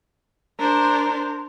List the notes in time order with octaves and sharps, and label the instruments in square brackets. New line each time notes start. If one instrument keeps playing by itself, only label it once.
[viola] D4 C5 [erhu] A#4